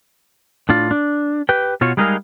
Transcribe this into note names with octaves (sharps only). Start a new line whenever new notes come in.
A2 D4 F4
D4
G4 B4 G5
B2 F4 F#4 C#5
G3 G#3 D#4 G#4 A#4 F5